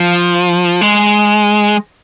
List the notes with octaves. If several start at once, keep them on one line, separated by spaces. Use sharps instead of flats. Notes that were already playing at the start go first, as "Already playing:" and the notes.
Already playing: F3
G#3